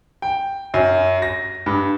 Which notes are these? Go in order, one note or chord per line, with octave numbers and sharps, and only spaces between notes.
G5
F#2
A#6
G2